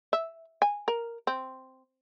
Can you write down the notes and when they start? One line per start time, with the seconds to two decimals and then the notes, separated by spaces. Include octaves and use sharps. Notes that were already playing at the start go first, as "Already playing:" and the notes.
0.13 E5
0.62 G#5
0.88 A#4
1.27 C4